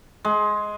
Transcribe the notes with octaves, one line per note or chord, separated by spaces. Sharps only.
G#3